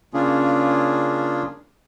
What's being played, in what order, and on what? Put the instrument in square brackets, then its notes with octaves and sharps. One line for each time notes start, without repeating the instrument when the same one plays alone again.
[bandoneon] C#3 A#3 C#4 D4 F4 G#4